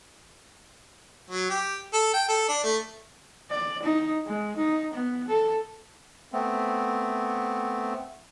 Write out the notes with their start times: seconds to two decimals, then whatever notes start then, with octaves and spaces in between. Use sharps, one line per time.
1.30 F#3
1.50 G4
1.93 A4
2.14 G5
2.29 A4
2.48 D4
2.64 A3
3.50 D5
3.83 D#4
4.27 G#3
4.57 D#4
4.93 B3
5.28 A4
6.32 A3 B3 C4